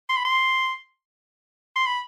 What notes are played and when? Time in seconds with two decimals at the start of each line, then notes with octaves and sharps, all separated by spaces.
0.09 C6
0.17 B5
0.25 C6
1.76 C6
1.86 B5